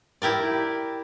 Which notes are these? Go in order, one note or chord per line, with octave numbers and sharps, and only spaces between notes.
E4 G4 A#4 D5